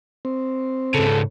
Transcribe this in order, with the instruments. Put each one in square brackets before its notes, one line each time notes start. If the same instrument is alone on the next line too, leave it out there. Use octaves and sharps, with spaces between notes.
[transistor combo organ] C4
[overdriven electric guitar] G#2 C#3 [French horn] A4